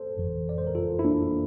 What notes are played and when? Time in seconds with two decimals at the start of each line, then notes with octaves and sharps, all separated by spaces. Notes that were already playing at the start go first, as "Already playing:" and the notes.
Already playing: A4 C5
0.17 G1 F2 E3
0.49 D5
0.58 C5
0.67 A#4
0.75 F4 A4
0.99 E4
1.04 A#3 D4